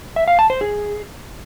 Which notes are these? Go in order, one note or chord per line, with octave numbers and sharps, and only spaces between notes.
E5
F5
A5
C5
G#4